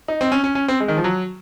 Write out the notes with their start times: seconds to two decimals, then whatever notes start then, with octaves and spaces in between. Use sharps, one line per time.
0.08 D#4
0.21 C4
0.32 C#4
0.44 C#4
0.55 C#4
0.68 C4
0.80 G#3
0.88 D#3
0.97 F3
1.04 F#3